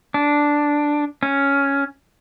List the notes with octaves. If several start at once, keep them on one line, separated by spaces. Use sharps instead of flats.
D4
C#4